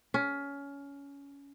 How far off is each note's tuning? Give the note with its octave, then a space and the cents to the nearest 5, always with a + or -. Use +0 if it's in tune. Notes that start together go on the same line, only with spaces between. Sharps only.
C#4 +20